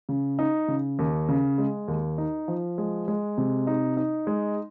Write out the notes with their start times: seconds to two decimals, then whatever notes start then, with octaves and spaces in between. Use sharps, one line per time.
0.09 C#3
0.39 D#4
0.68 C#3
0.99 D#2
1.29 C#3
1.58 G#3
1.88 D#2
2.18 D#4
2.48 F3
2.78 G#3
3.08 G#3
3.38 C3
3.67 D#4
3.97 D#4
4.27 G#3